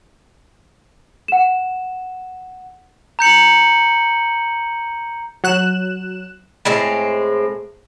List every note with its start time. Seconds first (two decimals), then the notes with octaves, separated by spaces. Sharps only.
1.28 F#5 E7
3.19 A#5 G6 C#7 F#7
5.44 F#3 F#6 E7
6.65 A2 G#3 C4